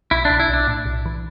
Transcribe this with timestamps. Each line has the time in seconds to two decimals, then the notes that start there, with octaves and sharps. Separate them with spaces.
0.11 B1 E4
0.25 D4
0.30 B1
0.40 E4
0.48 B1
0.54 D4
0.68 A2
0.86 B1
1.06 E3